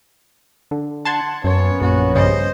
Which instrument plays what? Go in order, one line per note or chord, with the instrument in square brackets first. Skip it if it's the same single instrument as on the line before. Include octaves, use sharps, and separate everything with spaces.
[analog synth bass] D3
[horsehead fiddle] F#5 [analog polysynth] A5 C6 G#6
[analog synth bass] F#2 [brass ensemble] A#3 B3 C#4 [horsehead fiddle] C#5
[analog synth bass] A#1 [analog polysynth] F#2 [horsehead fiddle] F#4
[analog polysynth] G2 C#3 [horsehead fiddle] C5 D#5